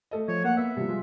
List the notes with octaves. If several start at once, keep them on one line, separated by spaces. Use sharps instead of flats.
A3 A4 D#5
F3 C#5
A#3 F#5
B3 E5
C3 F3 G3
G#3 F4